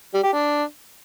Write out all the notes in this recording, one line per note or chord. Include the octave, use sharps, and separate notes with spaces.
G3
G4
D4